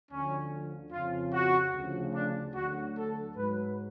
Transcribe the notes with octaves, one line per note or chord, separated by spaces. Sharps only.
D2 D3 F3 C#4
F2 C#3 F3 F4
F#4
D2 C#3 F3
D4
D2 D3 F#3 F#4
A4
G#2 F#3 B4